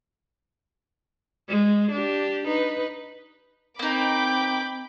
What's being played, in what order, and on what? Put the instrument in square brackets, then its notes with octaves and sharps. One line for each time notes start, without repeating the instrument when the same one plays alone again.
[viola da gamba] G#3
D4 G4
D#4 B4
[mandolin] A#3 D#4 [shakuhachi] C4 [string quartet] G5 B5 D6